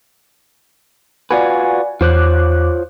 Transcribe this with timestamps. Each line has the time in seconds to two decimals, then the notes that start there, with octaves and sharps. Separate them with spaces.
1.31 F4 F#4 B4 D5 G#5
2.01 E2 F4 C5 C#5 D6 F#6